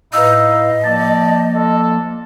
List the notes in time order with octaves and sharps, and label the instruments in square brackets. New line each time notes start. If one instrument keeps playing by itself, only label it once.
[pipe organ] A2 E4 F5 [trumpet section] D#4 [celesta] B4 E6 [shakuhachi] D#5
[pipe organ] F3 A#3 [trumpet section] G4 D5 A5 [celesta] A6
[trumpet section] D4 F4 A4